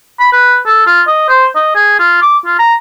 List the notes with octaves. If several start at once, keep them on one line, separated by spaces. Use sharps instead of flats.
B5
B4
A4
F4
D#5
C5
D#5
G#4
F4
D6
F4
A#5